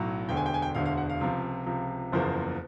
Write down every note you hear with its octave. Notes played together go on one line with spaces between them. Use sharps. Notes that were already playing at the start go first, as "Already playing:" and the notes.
Already playing: B1 A2 F#3
E1 D2 D3 G5
G#5
G5
G#5
G5
E1 D2 D3 F5
F5
F#5
F5
C#2 C3 F3
C#2 C3 F3
F#1 E2 C#3 F3 A#3 C5